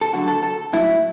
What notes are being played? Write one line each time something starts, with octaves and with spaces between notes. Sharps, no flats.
A4
D2 D3 F#3 F#4
A4
A4
A2 F#3 E4